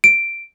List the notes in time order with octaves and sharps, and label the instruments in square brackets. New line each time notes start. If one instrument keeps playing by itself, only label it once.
[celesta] D7